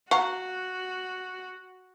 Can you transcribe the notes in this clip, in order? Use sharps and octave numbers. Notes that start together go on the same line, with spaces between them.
F#4 F5 F#5 A#5 C#6